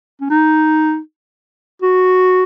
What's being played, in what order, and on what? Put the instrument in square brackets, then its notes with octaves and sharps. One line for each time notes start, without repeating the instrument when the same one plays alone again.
[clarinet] C#4
D#4
F#4